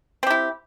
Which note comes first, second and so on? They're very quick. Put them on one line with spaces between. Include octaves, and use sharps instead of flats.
C4 G4 E4